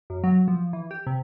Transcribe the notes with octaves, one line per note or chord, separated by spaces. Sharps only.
F#2
F#3
F3
E3
G4
C3